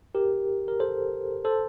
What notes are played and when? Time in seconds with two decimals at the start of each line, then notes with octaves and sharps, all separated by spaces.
0.15 G4 A#4
0.68 A#4
0.80 A4 C5
1.45 A4 C5